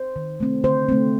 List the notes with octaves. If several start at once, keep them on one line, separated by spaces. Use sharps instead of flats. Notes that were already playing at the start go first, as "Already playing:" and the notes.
Already playing: C5
D#3
A3 C4
D3 C5
A3 C4